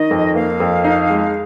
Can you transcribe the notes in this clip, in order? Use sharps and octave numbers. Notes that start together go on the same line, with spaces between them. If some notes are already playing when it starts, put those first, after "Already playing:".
Already playing: D#3 D#5
F2
A#3 F5
F2
D#4
G#3